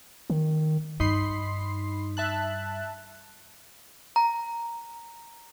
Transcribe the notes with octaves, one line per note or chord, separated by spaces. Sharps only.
D#3
G2 D#4 B5 C6 C7
E5 A5 F#6
A#5